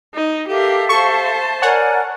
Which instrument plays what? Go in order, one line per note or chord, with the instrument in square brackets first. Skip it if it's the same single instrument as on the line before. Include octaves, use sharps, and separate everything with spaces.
[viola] D#4
[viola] G4 A#4 [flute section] A4 E5 F5
[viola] C5 A5 [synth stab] C#6
[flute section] A#4 D5 G#5 [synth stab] C#5 F#5